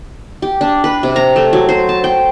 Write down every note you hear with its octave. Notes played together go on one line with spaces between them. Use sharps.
G4
D4
B4
C3
A#5
A3
F#3
C5
A5
G5